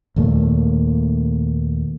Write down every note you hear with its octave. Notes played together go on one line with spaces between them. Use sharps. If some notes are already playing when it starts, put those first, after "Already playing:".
D#2 A#2 A3 A#3